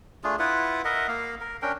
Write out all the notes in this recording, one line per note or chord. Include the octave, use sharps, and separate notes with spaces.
A3 D4 F4 G#4
E4 F4 B4 F#5
A#4 D#5 E5 F#5
A#3 F5
A#4
C#4 D4 A#4 G5